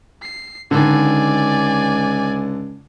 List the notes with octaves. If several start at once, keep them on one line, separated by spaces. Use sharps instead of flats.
C7
C#2 D3 D#3 D5 G#5